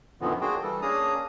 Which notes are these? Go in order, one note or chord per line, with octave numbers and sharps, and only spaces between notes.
F#2 A#2 D3 D#3 F3 B3
A#3 D4 F#4 G#4 C5 G5
E3 G3 A4
A#3 C#4 D4 G#4 A#5 D#6